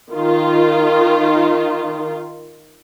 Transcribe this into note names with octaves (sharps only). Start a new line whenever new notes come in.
D#3 F4